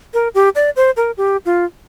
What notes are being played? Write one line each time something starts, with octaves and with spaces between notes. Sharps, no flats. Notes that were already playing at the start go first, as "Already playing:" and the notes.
A#4
G4
D5
C5
A#4
G4
F4